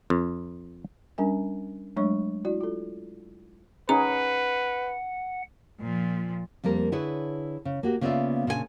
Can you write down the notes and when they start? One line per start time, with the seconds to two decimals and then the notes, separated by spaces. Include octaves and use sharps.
0.10 F2
1.18 G3 C#4 D4 A#4 G#5
1.96 F#3 G#3 A3 D4 C#5 C#6
2.45 E4 F#4 D5
2.61 F4 A4
3.89 C#4 D#4 G#4 B4 F#5 A#5
5.80 A#2 F3
6.64 F2 G3 A#3 A#4
6.92 D3 E4 G#4 B4 C#5
7.65 C#3
7.83 A#3 F#4 G4
8.01 C#3 A#3 B3 F4 D5 E5
8.47 A#2 C#3 D4 G#4 G#5